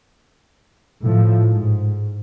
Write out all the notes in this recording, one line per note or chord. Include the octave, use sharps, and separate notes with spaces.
A2 F3
G#2